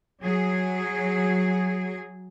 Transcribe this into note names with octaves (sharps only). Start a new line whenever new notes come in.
F#3 G#4